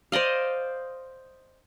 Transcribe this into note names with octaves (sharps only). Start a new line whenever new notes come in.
C5 D5 D#5 F5